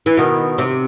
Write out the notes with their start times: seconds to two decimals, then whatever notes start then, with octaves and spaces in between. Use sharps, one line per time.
0.06 E3
0.17 B2 D#3
0.58 C3